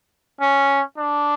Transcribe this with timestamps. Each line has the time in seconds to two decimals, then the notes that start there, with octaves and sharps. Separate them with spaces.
0.41 C#4
0.98 D4